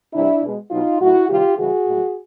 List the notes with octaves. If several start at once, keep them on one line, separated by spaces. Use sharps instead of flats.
C3 E3 G3 D4 E4
B2 G#3
B2 F#3 D#4 F4
A2 F#3 E4 F#4
C3 D#3 G3 F4 G4
C#3 E3 G3 F#4 G#4
A2 F#3